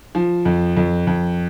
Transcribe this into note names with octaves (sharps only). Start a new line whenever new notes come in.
F3
F2
F2
F2